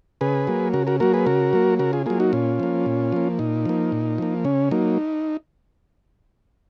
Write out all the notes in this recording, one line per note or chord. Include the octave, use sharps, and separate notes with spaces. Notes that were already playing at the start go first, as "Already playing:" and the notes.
C#3 G#4 B4
F#3 A#3
C#3 F#4 A#4
F#4 A#4
F#3 A#3 F#4 A#4
G#4 B4
C#3 F#4 A#4
F#3 A#3
C#3 F#4 A#4
F4 G#4
F#3 A#3 F4 G#4
D#4 F#4
A#2 C#4 F4
F3 A#3
A#2
F3 A#3
A#2 D#4
F3 A#3
A#2
F3 A#3
C#3 C#4
F#3 A#3 D#4